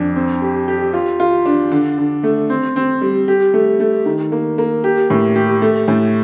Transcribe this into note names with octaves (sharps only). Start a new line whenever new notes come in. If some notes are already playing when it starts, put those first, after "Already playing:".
Already playing: F2 D4
C4
G4
G4
F4
F4
D4
D3
D3
A3
C4
C4
G3
G4
A3
A3
D#3
A#3
A#3
G4
A2
G4
A3
A2